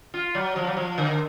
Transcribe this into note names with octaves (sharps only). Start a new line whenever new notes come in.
F4
F#3
F3
F#3
F3
D3